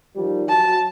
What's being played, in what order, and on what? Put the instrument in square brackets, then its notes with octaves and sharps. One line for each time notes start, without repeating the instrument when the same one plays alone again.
[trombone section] D#3 F3 G3
[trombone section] F#3 [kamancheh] A5